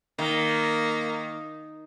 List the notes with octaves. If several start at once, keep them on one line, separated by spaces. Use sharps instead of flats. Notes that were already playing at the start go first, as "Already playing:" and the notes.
D#3 A#3